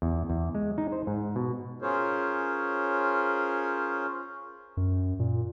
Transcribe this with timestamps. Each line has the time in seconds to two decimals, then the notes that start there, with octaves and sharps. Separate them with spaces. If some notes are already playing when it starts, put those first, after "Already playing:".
0.02 E2
0.30 E2
0.55 G#3
0.78 D#4
0.92 C5
1.07 G#2
1.36 B2
1.82 C#4 F4 G#4 A#4 C5 C#5
4.77 F#2
5.19 A#2